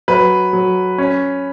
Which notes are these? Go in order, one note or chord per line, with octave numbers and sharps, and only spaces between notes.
F#3 B4
F#3
C#4